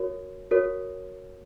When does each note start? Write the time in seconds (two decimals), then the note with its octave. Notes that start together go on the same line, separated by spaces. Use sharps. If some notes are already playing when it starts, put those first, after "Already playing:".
Already playing: F#4 A#4 C#5
0.51 F#4 A#4 C#5